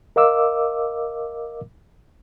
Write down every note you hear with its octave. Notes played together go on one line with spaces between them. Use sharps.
A#4 D#5 F5 D6 E6